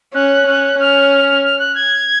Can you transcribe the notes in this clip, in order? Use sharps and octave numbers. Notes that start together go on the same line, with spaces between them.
C#4 F#6
C#4
C#4 F6
F6
F#6
G#6